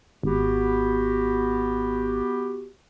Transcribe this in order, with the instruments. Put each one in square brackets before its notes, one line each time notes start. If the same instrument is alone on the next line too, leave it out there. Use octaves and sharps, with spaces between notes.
[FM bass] G#1 [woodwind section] B3 F#4 G4